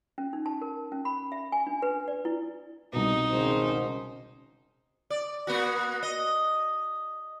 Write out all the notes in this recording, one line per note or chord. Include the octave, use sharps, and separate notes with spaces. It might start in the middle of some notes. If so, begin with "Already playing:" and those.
C#4
D#4
A5
A#4
C#4
B5
E5
G#5
D4
B4
D5
E4
C2 B2 D#4
G#1 C#3 C5
D5
A#3 B3 F#4
D#5